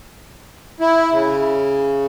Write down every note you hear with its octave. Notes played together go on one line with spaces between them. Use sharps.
E4
C#3